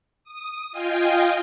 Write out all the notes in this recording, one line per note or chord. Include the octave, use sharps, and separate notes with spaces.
D#6
F4 D#5 F5 G5 G#5